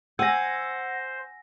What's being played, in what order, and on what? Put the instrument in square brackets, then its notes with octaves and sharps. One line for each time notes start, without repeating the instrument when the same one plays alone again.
[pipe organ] C5 [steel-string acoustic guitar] F#5 [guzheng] G#5 [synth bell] E6 A#6